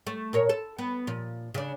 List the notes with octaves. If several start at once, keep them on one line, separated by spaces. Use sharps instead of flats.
A3
A#2 A#4 C#5
A4
B3
A#2 F3
C#3 D4